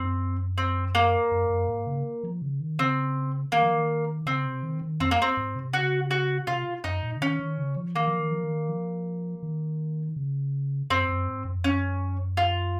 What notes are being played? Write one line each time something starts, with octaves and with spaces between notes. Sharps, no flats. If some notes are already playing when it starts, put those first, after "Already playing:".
Already playing: F#2 C4
C4
A#3
F#2
F#2
G#2
C#3
F3
C#3
D#3
C#3 C4
D#3 A#3
F3
D#3
C#3 C4
C3
D#3
D#3
F2 C4
A#3
C4
G#2
C3
C#3 F#4
F#4
C3 F4
F#2 D#4
A#2
C#3
D#3 C#4
D#3
C#3
F3
D#3 A#3
F3
D#3
F3
D#3
F3
D#3
C#3
F#2 C4
F#2
G#2
F#2
F2
C#4
F#2
F4